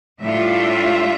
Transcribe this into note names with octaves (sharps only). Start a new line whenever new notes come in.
A2 G3 D4 F4 E5